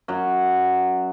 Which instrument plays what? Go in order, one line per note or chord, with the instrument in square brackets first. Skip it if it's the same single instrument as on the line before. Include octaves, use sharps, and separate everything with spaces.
[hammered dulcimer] F#2 F#3